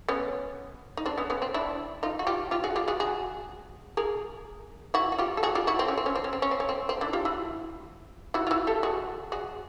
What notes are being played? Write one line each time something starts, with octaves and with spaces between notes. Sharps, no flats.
B3 C#4
D#4
C4 D4
B3 C#4
B3 C#4
C4
D4 E4
D#4 F4
F#4
F4 G4
F4 G4
F#4 G#4
F4 G4
F#4 G#4
F#4 G#4
G#4 A#4
E4 F#4
F#4
F4 G4
A4
F#4 G#4
F4 G4
E4 F#4
C4
C#4
C4
C#4
C4
C#4
C4
C#4
C4
C#4
C4
C4
D4 E4
F4 G4
E4 F#4
E4 F#4
F4
E4 F#4
G4 A4
F#4 G#4
F#4 G#4